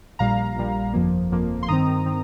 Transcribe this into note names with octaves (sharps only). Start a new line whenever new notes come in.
A#1 A#2 G3 F5 A#5
A#1 A#2 G3
G1 F2 F3 A#3
G1 F2 F3 A#3
C6
G2 D#3 C4 A#5 D#6
D#3 C4